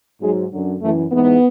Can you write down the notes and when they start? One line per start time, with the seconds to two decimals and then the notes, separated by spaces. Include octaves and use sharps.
0.21 G#2 F#3 G#3
0.51 F#2 D3 F#3
0.81 F#2 E3 A3
1.11 G#2 E3 B3